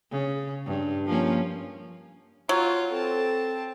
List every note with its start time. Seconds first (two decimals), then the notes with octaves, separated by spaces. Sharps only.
0.11 C#3
0.66 G2
1.07 F3 A#3 C#4
2.49 F#3 F4
2.91 C4 A4 A5